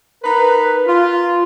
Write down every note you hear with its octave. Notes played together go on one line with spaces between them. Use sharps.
D#4 A#4 B4
F4